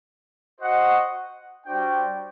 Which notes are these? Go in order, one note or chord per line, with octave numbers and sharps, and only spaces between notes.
F#4 C5 D#5 F#5
G3 D4 F#4 C5 G5